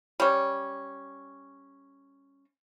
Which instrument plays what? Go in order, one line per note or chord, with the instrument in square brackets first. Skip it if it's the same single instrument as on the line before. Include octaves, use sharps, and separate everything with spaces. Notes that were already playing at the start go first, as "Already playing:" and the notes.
[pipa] G3 C#4